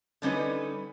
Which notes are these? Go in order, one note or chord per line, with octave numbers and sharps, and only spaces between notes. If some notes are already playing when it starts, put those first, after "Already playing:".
D3 G3 C#4 D#4 B4